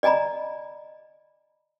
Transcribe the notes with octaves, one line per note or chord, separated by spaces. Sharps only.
D5 D#5 G#5 A#5 B5